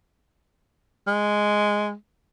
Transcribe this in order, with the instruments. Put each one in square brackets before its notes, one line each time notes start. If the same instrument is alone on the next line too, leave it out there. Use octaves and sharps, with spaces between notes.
[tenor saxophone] G#3